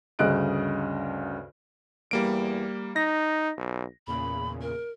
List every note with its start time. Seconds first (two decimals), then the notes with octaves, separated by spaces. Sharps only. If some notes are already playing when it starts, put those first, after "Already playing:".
0.19 D2 G2 C#3 D#5 F#6 D7
2.11 E2 G3 A#3 D7
2.96 D#4 A#6
3.57 B1
4.07 E2 A#2 C#3 B5
4.61 A#4